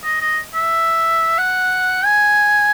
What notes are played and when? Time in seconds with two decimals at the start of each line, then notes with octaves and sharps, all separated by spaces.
0.04 D#5
0.21 D#5
0.54 E5
1.38 F#5
2.05 G#5